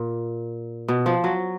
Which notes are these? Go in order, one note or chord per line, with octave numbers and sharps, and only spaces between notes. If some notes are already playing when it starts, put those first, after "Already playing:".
Already playing: A#2
B2
F3
F#3